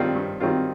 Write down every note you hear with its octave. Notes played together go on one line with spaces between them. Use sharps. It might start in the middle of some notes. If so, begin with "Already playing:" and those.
Already playing: G2 D#3 G3 C4 F4
G2
D#3 G3 C4 F4